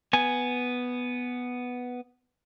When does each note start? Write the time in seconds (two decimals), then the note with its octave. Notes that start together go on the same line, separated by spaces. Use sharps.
0.13 B3 G#5